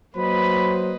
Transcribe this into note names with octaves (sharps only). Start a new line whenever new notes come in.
F#3 A#3 B4 C5 D#5 B5